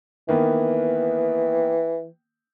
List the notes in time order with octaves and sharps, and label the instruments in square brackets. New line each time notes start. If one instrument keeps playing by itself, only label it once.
[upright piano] D#3 A#3 B3 [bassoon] E3